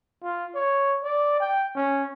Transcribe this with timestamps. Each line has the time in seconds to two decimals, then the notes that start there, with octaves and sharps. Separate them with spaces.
0.23 F4
0.55 C#5
1.04 D5
1.40 G5
1.76 C#4